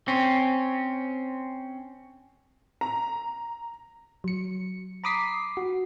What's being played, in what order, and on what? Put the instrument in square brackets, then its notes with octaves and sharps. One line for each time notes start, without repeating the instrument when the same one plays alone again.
[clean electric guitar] C4 C#4
[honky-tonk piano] A#5
[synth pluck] F#3 C#7
A#5 B5 D6 D#6 B6 C7
F#4